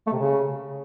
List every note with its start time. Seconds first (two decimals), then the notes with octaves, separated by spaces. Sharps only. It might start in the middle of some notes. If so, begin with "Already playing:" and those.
0.07 A3
0.13 C3
0.19 C#3